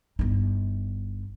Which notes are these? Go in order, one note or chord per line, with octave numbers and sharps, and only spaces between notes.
G1 D#4